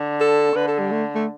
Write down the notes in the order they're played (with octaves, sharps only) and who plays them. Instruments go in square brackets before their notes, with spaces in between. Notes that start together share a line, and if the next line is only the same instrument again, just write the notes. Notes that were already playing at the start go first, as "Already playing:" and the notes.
Already playing: [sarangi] D3
[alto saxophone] A4
[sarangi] D3 [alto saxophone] B4
[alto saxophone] A4
G3
A3
A3